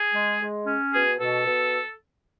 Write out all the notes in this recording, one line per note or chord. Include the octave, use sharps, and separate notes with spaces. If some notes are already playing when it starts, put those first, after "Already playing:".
Already playing: G#4
G#3
G#3
C#4
B2 G#4
B2 A4
B2